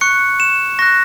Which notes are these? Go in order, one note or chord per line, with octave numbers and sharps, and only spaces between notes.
C#6 F#6 C#7
E7
C#6 F#6 A#6